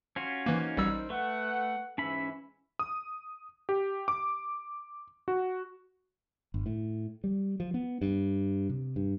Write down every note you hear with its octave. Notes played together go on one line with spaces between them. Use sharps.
C#4 F4 F#4
E3 A#3 D#4 A#4 C5
A1 G3 E6
A3 B4 F#5
G#2 E3 C#4 E5 B5
D#6
G4
D6
F#4
G1
A2
G3
F3
B3
G2
C3
G2